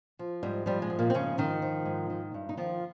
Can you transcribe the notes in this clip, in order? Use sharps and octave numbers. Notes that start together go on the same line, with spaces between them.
F3
G#2 G3
F3 G3
G#3
G#2
A#2 A#3
C4
C#3 F3 C#4
G#2 D#3 D#4
F3
G#2
D#3
G2
D#4
D#3 F3 F4